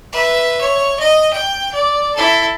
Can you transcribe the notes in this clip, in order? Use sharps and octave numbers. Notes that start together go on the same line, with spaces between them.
B4 E5
C#5
D#5
G5
D5
E4 A4